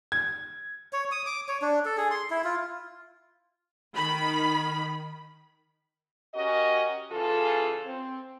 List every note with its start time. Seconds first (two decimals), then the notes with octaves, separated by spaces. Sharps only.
0.12 G#6
0.93 C#5
1.11 D#6
1.26 D6
1.49 C#5
1.62 D4
1.85 A4
1.97 G#4
2.11 C6
2.30 E4
2.44 F4
3.95 D#3 B5
6.35 C#4 F#4 G4 A#4 D#5
7.12 C#3 E3 F4 G#4 A4
7.85 C4